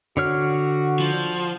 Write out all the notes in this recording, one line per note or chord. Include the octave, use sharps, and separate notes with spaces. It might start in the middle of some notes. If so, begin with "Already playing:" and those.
D3 F#4 C#5 F6
F3